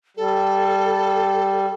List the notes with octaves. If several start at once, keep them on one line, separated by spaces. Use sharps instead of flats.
G3 A4